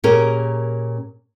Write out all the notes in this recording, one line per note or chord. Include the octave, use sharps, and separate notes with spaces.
A#2 C#4 G4 G#4 A#4